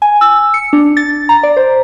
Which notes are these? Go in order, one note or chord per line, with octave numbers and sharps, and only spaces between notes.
G#5
E6
C#7
D4
A6
A#5
D5
C5